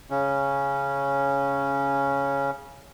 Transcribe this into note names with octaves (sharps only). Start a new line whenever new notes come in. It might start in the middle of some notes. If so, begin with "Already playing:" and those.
C#3 C#4